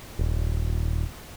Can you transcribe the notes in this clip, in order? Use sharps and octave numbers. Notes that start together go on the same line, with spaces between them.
D#1